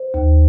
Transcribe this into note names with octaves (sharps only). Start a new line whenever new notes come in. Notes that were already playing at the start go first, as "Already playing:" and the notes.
Already playing: C5
D#2